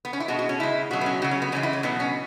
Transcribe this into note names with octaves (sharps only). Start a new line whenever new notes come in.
B3
C#4
E4
B2 G#3 F#4
F#4
C#4
C#3 G#3 E4
B2 F#3 F#4
B3
C#4
C#3 F#3 F#4
C#4
B3
C#3 E3 G#3 C#4
E4
C#4
B2 F#3 B3
C#4